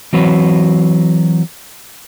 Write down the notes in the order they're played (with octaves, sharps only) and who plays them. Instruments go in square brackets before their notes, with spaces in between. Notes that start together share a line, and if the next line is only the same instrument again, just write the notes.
[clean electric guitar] E3 F#3 C4 F#4 B4 C#5